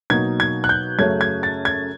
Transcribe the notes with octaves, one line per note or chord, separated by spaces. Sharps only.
B2 F#3 A#3 D#4 G#6
G#6
F#6
G6
F#2 C#3 F#3 A3 C#4 G#6
G#6
A6
G#6